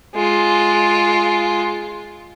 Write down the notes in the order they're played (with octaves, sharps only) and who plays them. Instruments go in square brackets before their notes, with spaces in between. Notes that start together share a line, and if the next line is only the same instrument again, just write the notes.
[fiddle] G#3 F4